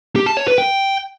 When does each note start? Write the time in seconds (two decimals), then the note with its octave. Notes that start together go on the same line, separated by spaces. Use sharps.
0.16 G4
0.26 A5
0.37 C#5
0.47 B4
0.58 G5